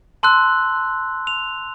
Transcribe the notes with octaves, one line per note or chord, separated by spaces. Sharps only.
A5 C6 E6 F#6
F7